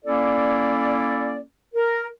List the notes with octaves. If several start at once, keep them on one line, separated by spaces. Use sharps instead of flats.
A#3 C#4 E4 A4 D5
A#4